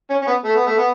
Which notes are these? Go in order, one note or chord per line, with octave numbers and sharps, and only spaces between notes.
C#4
C#4
B3
A3
B3
A3
B3